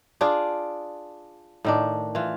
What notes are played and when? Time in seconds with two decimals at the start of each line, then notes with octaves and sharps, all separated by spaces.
0.21 D4 F4 G#4 D5
1.64 A2 D#3 D4
2.15 E3 F4